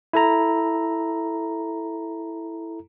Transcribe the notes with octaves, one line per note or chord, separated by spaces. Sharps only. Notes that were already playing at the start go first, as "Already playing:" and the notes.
E4 A4 A#5